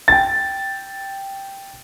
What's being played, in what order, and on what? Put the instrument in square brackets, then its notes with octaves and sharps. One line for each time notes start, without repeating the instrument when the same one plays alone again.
[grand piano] G5 A6